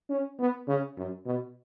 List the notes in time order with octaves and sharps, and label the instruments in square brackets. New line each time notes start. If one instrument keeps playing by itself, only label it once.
[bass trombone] C#4
B3
C#3
F#2
B2